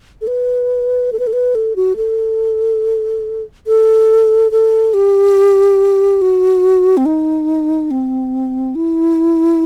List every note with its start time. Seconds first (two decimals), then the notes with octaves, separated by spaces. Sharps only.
0.21 A4
0.27 B4
1.13 A4
1.19 B4
1.27 A4
1.33 B4
1.55 A4
1.76 F#4
1.97 A4
3.67 A4
4.51 A4
4.94 G4
6.22 F#4
6.97 C4
7.06 D#4
7.91 C4
8.75 E4